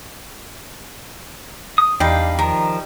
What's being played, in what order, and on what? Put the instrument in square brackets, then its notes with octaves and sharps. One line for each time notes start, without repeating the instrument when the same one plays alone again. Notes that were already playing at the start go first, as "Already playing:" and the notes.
[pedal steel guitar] D#6
[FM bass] E2 [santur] G3 D#4 [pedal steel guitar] D4 F5 [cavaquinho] B4 G5
[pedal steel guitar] D#3 F3 [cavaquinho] A#4 A#5